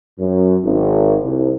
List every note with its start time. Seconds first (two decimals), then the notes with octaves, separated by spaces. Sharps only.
0.18 F#2
0.64 G#1
1.22 C2